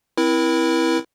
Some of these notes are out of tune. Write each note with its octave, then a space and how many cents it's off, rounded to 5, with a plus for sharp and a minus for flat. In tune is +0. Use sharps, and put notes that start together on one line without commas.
C4 +0 E4 +0 A#4 +40